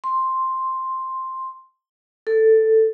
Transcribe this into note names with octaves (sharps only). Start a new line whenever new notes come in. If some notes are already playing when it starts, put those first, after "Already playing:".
C6
A4